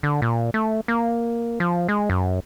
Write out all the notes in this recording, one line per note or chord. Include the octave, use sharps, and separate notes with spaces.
D3
A#2
A3
A#3
F3
G#3
F#2